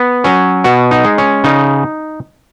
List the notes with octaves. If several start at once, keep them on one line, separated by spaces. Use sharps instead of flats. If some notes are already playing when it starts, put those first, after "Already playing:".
Already playing: B3
F#3 C#4
B2 F#4
D#4
G#3
C#4
C#3 D#4